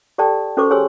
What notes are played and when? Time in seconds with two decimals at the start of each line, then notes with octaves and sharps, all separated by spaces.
0.18 G4 A4 D5 G5 A5
0.57 C#4 F#4 A4 C5 C#6 D6
0.70 G4 G#4 C#5 G#5 C6 E6